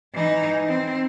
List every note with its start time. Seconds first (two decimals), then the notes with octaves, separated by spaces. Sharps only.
0.13 E3 D#4
0.67 C4